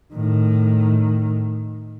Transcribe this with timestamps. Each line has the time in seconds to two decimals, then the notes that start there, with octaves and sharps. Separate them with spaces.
0.14 A2 D#3